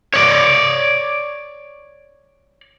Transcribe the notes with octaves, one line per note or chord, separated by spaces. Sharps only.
C#5 D5